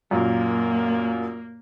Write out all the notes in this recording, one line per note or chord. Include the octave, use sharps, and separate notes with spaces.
F#2 A#2 A#3